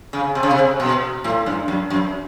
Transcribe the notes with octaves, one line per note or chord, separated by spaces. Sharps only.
C#3
C3
C#3
C3
B2
A2
G2
F#2
F#2